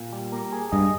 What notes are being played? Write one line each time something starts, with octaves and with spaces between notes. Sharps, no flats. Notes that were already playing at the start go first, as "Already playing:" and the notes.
Already playing: A#2
G3
A#3
G#4
G2 D#5